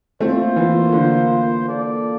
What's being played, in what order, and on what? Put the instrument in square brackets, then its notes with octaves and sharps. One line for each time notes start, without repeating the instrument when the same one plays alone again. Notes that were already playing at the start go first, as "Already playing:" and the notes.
[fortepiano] A3 C4 [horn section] A#3 F4 C5
[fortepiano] E3
D3
[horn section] A#3 F4 A4 D5